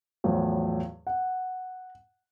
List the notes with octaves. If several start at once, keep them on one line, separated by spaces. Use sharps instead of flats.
E2 A2 F3 F#3
F#5